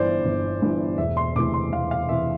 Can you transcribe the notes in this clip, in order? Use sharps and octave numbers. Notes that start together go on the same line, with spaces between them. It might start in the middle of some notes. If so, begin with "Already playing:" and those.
Already playing: G1 G2 E3 C5 D5
G1
G2 E3
E1 E5
C6
D2 C3 E3 D6
C6
E1 F5
F5
C3 E3 E5